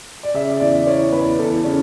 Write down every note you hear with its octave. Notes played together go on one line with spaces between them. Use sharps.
D5
C#3 E5
E2 D5
E3 C#5
E2 B4
E2 A4
C#3 C#4